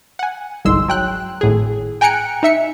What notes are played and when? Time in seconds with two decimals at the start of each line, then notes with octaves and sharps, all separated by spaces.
0.19 F#5 G#5
0.65 G1 C2 G#2 G#3 C6 E6
0.88 F#3 G5 F#6
1.41 G#1 A2 G#4
2.01 G5 G#5 A#5 F#6 C#7 D7
2.43 D#4 E5 C#7